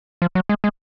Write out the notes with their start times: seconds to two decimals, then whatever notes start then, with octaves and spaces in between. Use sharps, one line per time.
0.22 F3
0.35 F#3
0.49 G#3
0.64 G#3